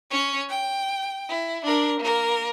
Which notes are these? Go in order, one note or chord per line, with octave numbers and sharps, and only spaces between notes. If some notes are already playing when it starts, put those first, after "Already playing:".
C#4 C#5
G5
E4
D4 A#4
A#3 A#4